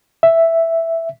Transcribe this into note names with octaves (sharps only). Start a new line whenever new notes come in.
E5